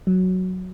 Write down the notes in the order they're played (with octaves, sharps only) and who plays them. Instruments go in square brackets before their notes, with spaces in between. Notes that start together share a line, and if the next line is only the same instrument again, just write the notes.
[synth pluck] F#3